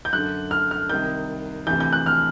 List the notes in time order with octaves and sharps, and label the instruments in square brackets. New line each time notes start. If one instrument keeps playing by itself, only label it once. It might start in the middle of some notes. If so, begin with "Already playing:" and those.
[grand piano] G6
F#2 D3 F#6
F6
F6
C2 C3 D#3 G6
D2 C3 E3 G6
G6
F#6
F6